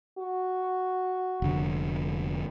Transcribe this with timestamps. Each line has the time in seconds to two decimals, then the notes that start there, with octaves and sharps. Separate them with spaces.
0.18 F#4
1.42 F1 D3